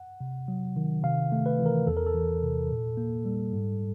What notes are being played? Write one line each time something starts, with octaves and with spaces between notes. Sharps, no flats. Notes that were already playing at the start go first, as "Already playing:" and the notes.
Already playing: F#5
C3
F#3
D#3
C3 F5
A3
B4
E3
A#4
E2 A4
A#4
A4
E3
C3
A#2
A#3
G3
G#2